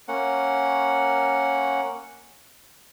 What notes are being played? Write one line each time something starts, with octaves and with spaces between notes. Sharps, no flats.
A#3 C#4 F#5